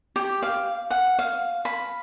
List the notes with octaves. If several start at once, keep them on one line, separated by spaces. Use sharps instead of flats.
G4
F5
F#5
F5
B5